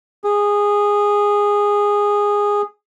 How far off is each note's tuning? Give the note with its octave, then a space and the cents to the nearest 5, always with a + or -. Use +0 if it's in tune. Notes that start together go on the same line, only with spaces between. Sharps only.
G#4 -15